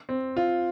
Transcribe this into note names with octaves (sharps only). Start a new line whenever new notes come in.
C4
F4